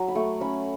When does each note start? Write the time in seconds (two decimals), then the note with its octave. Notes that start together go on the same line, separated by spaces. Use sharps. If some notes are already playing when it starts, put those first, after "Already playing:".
Already playing: F#3
0.08 B5
0.15 A3 C#6
0.41 C#4 B5